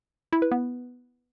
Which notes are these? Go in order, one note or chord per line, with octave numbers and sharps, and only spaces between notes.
E4
B4
B3